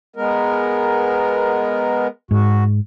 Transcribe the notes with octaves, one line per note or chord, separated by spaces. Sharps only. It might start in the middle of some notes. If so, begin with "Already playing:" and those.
G#3 B3 A#4
G#2 F#4